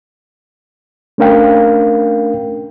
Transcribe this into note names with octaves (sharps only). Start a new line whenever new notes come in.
A3 C#4 D4 A#4 F5 G5